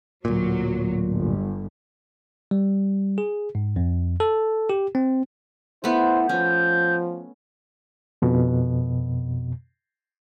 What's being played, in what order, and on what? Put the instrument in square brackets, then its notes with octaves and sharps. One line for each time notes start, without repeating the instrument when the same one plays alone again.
[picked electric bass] D1 A#2 [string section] F#3
[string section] G1
[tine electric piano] G3
G#4
G#2
F2
A4
G4
C4
[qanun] A3 B3 [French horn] E4 [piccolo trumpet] C5
[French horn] F3 [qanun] C#4 [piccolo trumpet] G6
[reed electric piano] F2 B2